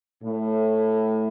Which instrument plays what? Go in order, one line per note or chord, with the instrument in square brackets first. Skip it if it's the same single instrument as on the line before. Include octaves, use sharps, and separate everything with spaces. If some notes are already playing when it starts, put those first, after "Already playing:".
[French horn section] A2